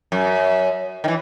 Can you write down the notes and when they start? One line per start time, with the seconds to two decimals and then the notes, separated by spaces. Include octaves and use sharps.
0.12 F#2
1.04 D#3 E3